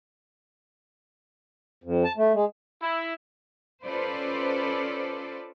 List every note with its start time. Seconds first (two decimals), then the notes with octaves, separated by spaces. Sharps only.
1.84 F2
2.04 A5
2.17 A3
2.34 G#3
2.82 E4
3.83 C#4 F4 A4 B4 C5 D5